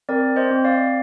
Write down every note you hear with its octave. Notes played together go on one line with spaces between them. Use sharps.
C4 A#4 D5
C5 D#5
C4
D5 F5